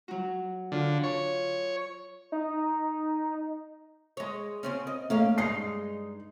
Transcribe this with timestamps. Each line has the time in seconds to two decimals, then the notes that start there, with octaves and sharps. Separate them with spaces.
0.08 F#3 F#4
0.72 D3 F4
1.03 C#5
2.32 D#4
4.17 G#3 C#5
4.63 C#3 C4 C#4
4.87 D#5
5.10 A3 A#3 C#4 F5
5.38 G2 G#3 D#4 C7